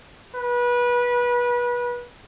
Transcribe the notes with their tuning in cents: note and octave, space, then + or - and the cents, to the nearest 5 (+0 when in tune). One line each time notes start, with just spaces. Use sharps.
B4 -25